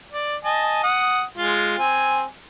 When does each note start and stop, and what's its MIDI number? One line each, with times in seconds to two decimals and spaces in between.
0.12 0.36 74
0.45 0.83 75
0.45 0.83 80
0.45 0.83 81
0.83 1.23 78
0.83 1.23 87
1.38 1.77 56
1.38 1.77 65
1.78 2.25 60
1.78 2.25 80